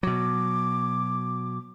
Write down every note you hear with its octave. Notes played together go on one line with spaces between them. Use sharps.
B2 F#3 D6